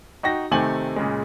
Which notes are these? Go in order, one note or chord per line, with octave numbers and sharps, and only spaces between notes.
D#4 F#4 G5 A#6
C3 D#3 A3 C4 G#5 F#7
A#2 C#3 G#3